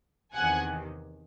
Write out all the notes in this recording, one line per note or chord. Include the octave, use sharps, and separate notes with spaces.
E2 C3 D#3 F#5 G#5